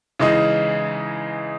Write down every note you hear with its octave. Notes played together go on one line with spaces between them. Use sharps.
C#3 E3 G#3 D#4